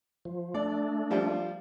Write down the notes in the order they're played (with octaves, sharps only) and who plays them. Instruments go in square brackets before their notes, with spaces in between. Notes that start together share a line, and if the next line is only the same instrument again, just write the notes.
[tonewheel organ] F3
[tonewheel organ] A3 D4 [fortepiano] D5
[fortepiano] F3 G3 F4